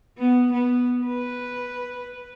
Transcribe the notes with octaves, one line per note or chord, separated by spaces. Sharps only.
B3
B3
B4